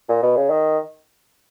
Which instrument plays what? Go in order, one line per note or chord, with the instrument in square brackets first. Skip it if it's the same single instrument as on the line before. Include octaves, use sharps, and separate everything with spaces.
[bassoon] A#2
B2
C#3
D#3